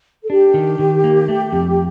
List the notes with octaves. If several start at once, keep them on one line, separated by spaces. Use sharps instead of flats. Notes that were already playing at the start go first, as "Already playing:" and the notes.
A4
D4 G4
D#3
D#3
A#3
A3
F2